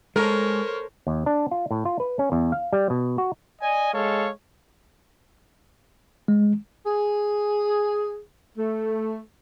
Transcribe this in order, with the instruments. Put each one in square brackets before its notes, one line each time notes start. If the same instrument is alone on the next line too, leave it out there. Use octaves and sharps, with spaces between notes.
[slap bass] G#3 [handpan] A4 [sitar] A#4 [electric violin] C5 C#5
[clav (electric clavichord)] D#2
D4
F4
A2
F4
B4
C#4
E2
F5
G3
B2
F#4
[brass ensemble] D5 D#5 G#5
G#3 A4 C#5 F5
[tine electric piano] G#3
[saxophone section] G#4
A3